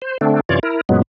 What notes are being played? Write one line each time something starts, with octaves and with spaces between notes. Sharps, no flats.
C5
D3 A3 C4 D4
F#2 C3 E3 F4 C#5 D5
E4 A#4
F#2 A#2 F#3 G#3 B3